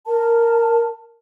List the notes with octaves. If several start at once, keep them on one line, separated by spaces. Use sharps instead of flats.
A#4 A5